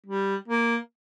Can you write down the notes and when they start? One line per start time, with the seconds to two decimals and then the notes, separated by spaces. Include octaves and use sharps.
0.07 G3
0.48 A#3